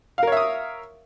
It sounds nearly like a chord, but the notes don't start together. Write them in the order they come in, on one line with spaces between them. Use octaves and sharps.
F5 A#4 C#5 E5 D#6